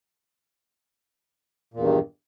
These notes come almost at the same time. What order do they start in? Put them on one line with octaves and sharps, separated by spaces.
A#2 E2 G2 D#3